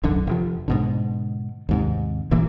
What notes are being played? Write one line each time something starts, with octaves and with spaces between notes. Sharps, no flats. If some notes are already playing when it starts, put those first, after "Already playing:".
E1 B1 F#2 D3
F1 F3
G#2 B2 D3
D#2 G#2 C3
G1 A#2 E3 A#3